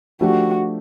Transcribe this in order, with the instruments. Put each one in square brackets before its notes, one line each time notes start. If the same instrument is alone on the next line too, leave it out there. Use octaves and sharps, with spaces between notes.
[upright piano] F3 A3 D4 G4 [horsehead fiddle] F#4